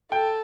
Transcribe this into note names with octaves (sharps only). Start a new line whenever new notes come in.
A4 G5